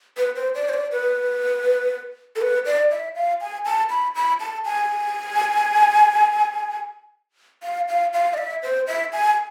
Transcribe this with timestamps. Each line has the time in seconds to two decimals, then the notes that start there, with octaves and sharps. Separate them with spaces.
0.17 B4
0.36 C5
0.55 D5
0.69 C5
0.74 D5
0.92 B4
2.36 A4
2.41 B4
2.66 D5
2.91 E5
3.15 F5
3.41 G#5
3.65 A5
3.90 B5
4.15 B5
4.40 A5
4.65 G#5
7.63 F5
7.89 F5
8.13 F5
8.34 D5
8.38 E5
8.63 C5
8.87 E5
9.13 G#5